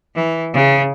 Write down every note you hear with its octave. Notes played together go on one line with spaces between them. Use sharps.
E3
C#3